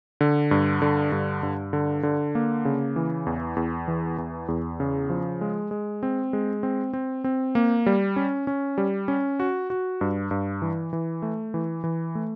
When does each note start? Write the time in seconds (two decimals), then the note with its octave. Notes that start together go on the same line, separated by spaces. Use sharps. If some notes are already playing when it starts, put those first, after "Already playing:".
0.21 D3
0.51 G2
0.82 D3
1.12 G2
1.43 G2
1.73 D3
2.03 D3
2.35 A#3
2.65 C#3
2.96 E3
3.26 E2
3.56 E2
3.88 E3
4.18 E2
4.48 E2
4.80 C#3
5.10 F3
5.41 G#3
5.71 G#3
6.03 C4
6.33 G#3
6.63 C4
6.93 C4
7.24 C4
7.55 A#3
7.86 G3
8.16 C#4
8.47 C#4
8.78 G3
9.08 C#4
9.40 F#4
9.70 F#4
10.01 G2
10.31 G2
10.62 E3
10.93 E3
11.22 A3
11.54 E3
11.84 E3
12.15 A3